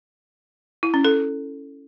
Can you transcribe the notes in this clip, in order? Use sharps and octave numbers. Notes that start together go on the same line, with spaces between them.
E4
C#4
A4